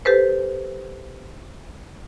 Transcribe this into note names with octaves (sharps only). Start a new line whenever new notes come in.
G4 A4 B4 C5